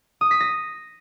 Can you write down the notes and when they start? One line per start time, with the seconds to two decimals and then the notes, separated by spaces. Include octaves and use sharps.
0.21 D#6
0.31 B6
0.40 A#6